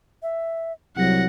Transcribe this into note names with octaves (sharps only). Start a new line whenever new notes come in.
E5
C2 F#3 G4 F#5 A#6